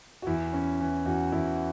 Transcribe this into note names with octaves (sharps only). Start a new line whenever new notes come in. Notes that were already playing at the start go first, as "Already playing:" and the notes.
F#4
E2 E4
C#4
E3
E2 F#4
E2 E4